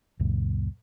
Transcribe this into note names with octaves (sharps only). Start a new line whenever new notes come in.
C#2 F#2 A#2